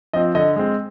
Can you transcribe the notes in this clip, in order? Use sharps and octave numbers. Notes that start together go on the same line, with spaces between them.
F3 C4 D#5
D3 D#5
G#3 C4